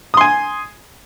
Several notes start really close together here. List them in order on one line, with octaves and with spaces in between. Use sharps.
D#6 C6 G#5